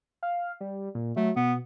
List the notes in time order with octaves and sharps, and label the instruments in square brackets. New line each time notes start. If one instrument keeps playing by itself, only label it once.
[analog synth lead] F5
G3
A#2
[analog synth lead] F#3 [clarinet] A3
[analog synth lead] B2 [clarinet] B3